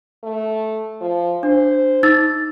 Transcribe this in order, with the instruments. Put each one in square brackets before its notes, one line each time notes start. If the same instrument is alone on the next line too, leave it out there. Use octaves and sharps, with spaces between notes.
[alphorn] A3
F3
[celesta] D4 [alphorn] C5
[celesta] D#4 E6 A6